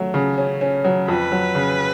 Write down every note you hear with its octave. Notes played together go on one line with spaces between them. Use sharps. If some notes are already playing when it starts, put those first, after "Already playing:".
Already playing: F#3 A3
C#3
C#4
C#4
F#3
F2 B4
F#3
C#3